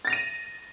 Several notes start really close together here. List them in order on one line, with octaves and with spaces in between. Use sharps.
A6 A#6 F7 D#7